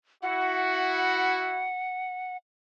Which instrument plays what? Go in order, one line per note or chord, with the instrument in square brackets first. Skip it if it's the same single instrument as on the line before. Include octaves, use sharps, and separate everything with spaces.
[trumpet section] E4 F#4 [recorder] F#5